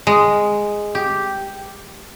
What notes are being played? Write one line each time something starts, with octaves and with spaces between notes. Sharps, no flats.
G#3
G4